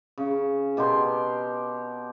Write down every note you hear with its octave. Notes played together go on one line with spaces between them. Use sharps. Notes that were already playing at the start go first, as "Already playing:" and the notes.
C#3
B2 G4 A#5 C6